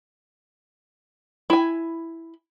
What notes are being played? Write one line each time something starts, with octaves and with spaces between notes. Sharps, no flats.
E4 G#5